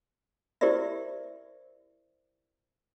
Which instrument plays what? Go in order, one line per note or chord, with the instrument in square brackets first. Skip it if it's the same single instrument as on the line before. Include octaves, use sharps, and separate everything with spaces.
[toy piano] E4 G4 A#4 C5 D5 E5